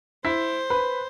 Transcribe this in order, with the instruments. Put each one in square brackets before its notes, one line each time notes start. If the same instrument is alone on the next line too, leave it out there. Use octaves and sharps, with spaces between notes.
[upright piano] E4 [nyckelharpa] C5 [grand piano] B6
[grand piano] B4 [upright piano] B5